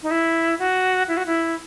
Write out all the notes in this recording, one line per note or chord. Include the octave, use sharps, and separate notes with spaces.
D#4
E4
F#4
E4
F#4
E4